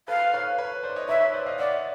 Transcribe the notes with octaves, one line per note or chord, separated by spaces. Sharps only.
A4 B4 F5
B4 C#5
B4 C#5
C5 D5
C#5 D#5
B4 C#5 E5
B4 C#5
C5 D5
D#5 F5
D5 E5 F#5